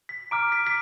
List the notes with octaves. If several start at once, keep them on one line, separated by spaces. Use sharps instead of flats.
B6
A#5 D6 F6 D7
B6
B6